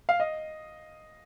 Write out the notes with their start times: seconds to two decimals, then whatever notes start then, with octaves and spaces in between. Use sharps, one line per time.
0.09 F5
0.20 D#5